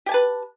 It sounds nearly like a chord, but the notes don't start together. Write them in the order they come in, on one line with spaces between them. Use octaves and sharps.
G4 G#5 A5 B4